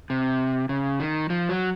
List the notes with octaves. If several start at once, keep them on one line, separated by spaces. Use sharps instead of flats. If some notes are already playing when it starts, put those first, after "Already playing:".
C3
C#3
D#3
F3
F#3